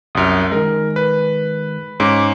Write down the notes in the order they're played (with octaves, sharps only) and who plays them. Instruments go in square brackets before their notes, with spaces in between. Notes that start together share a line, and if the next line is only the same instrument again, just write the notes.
[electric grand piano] C2 F#2 [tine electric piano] D#6 F6
[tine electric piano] D#3 G#3 [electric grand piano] A#4
[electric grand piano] B4
[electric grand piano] G#2 C#4 [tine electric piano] D6